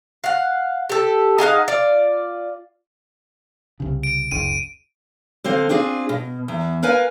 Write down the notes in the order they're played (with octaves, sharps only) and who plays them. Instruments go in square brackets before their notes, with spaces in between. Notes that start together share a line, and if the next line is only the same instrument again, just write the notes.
[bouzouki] F5 F#5
G4 A4
D#4 G#4 F5 F#5
F4 D5
[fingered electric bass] C2 C#3
[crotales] D7
[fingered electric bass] F#1 C#2 [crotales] D#7
[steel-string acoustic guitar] D3 C4 C5 F5
C4 D4 F4 G#4
B2
E2
A#4 B4 F5 G#5